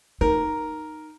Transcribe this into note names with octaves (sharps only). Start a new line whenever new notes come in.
D#4 A#4